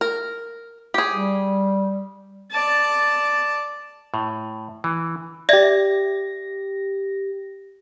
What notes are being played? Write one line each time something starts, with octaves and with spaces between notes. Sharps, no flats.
A#4
G4 G#4
G3
D5 A5
A2
E3
G4 D5 E5 G#6 A#6